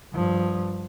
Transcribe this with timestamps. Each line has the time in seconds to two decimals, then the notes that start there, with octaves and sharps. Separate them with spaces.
0.13 G2 F3